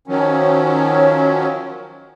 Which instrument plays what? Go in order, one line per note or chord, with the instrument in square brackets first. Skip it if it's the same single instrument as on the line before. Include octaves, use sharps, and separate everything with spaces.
[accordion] D#3 F3 F#3 C#4